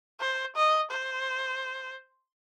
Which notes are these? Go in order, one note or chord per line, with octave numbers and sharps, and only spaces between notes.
C5
D#5
C5